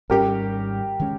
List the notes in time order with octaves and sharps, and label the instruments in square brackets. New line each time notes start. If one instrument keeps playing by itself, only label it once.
[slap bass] G#1 G#2 G3 C#4 [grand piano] G4 A#4
[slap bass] D#3 G#3 C#4